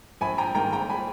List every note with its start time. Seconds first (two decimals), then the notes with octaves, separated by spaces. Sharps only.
0.21 A#1 G#5 B5
0.38 G5 A#5
0.55 G#2 D#3 A#3 G5 A#5
0.72 G5 A#5
0.89 G#5 B5